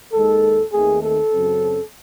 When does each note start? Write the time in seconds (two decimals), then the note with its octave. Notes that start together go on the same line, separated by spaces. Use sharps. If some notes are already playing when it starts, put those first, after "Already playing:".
0.13 D#2 D#3 G#3 A4
0.72 D#2 D#3 A3 C4 G#4
1.02 A4
1.32 F#2 C#3 F#3 C4